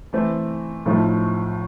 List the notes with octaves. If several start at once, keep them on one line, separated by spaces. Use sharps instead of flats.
E3 A3 C4
B1 A2 F3 A3